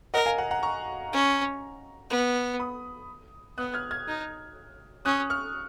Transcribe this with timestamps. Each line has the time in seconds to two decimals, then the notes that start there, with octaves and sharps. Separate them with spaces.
0.14 A#4 D#5 F#5
0.26 F5 G#5
0.38 F#5 A#5
0.51 F#5 A#5
0.63 A#5 C#6
1.13 C#4
2.10 B3
2.60 B5 D#6
3.58 B3 D#6 F#6
3.74 F6 G#6
3.91 F6 G#6
4.07 D#4
5.05 C#4 D#6 F#6
5.30 C#6 F6